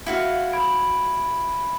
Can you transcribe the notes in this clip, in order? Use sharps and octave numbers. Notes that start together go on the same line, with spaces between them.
E4 F#4 F5
B5 G#6 D7